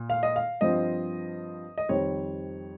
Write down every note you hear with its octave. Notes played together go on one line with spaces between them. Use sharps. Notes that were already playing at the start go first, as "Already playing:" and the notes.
Already playing: A#2
F5
D#5
F5
G2 F3 C4 F4 D#5
D#5
F2 D#3 G3 C4 C#5